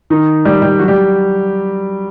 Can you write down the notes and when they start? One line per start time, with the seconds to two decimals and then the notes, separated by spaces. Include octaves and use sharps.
0.10 D#3 D#4
0.45 G3 G4
0.62 G3 G4
0.79 F#3 F#4
0.88 G3 G4